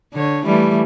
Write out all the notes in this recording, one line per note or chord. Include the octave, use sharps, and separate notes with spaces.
D3 C#5
E3 G3 A3